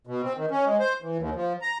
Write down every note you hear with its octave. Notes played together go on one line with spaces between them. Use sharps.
B2
C4
D#3
C#4
G#3
C5
E3
D#2
F3
A#5